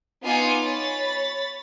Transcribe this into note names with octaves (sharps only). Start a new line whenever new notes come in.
B3 D#4 F4 G#5 D6 C#7
C#5 B5 A6